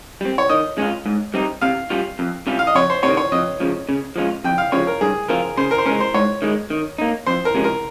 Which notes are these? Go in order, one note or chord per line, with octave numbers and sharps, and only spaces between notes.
G3 C4
C#5
D#3 D#5
G#3 C#4 F4
G#2
G3 C4 D#4
C3 F5
G3 C#4 F4
F2
C3 G3 C#4 F4
F5
D#5
F2 C#5
C5
C3 D#3 C#5
C#5
F2 D#5
C#3 F3
C#3
F3 G#3 C#4 F4
F2 G5
F5
C#3 F3 C#5
A#4
G2 G#4
F3 C4 F4 A#4
C#3 C5
A#4
C5
G#3 C#4 A#4
C5
G#2 C#5
D#3 G#3
D#3
A#3 D#4
F2 C5
A#4
C3 F3 G#3 C#4
A#4